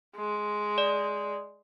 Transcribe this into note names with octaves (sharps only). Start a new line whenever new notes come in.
G#3
D5